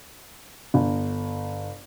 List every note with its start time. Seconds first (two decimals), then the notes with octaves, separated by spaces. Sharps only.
0.74 G1